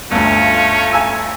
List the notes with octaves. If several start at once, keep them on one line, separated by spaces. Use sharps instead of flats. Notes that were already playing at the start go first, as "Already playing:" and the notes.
G1 D2 A3 C#4 F4
G#5 E6